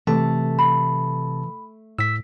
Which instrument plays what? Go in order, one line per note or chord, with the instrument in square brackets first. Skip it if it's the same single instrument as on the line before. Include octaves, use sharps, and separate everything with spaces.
[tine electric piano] C3 A5 [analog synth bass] E3 [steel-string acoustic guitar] A3
[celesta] B5
[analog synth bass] A2 [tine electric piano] E6 B6